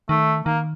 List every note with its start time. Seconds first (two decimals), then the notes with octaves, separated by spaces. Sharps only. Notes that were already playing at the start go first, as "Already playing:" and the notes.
0.09 D#3 A3
0.46 D#3 A#3